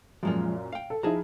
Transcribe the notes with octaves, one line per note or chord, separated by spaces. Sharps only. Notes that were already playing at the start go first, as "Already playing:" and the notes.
F#2 A#2 F3 G#3 F4
F5 G5
A4
F3 D#4 E4 G#4 A5 A#5